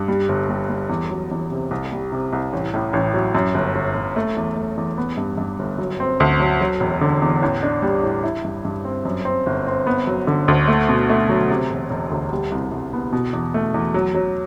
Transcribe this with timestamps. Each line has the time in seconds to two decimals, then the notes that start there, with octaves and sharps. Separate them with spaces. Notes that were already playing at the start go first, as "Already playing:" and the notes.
Already playing: G2
0.08 G3
0.29 G1
0.49 G3
0.69 G3
0.89 E2
1.10 F#3
1.31 E2
1.51 C3
1.71 C2
1.92 G3
2.12 C3
2.33 C2
2.53 A1
2.74 A2
2.93 A1
3.14 F#3
3.35 F#2
3.54 G1
3.75 G1
3.95 G1
4.16 A3
4.37 E2
4.56 A3
4.77 E2
4.98 B3
5.17 G2
5.38 G2
5.59 G1
5.78 F#3
6.00 C4
6.20 D2
6.40 F#3
6.61 F#3
6.80 E1
7.01 D3
7.22 E2
7.42 A1
7.63 D4
7.82 G3
8.03 A2
8.23 E4
8.45 G2
8.65 G2
8.85 C4
9.05 F#2
9.25 C4
9.46 G1
9.67 C4
9.87 B3
10.07 F#3
10.27 D3
10.48 D2
10.68 A3
10.89 B2
11.10 A3
11.29 F#3
11.50 C3
11.70 E1
11.90 E1
12.11 D2
12.32 G3
12.52 C2
12.72 C2
12.93 B3
13.12 B2
13.33 E2
13.54 A3
13.74 E2
13.94 F#3
14.15 F#3